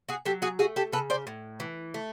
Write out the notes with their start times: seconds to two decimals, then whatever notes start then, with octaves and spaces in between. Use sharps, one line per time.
0.09 F#4 G#4
0.25 F#3 G4 A4
0.42 F#4 G#4
0.59 A3 F#4 G#4
0.76 G4 A4
0.93 C#3 A4 B4
1.10 C5 D5
1.27 A2
1.60 E3
1.94 A3